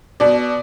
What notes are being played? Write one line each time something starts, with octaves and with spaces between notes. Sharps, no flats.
B2 D5